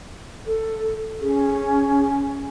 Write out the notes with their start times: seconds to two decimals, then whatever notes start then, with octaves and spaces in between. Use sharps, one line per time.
0.46 A4
1.21 C#4 G#4